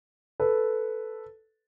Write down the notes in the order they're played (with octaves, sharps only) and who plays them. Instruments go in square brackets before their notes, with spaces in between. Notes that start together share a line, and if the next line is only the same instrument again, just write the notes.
[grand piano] A4 B4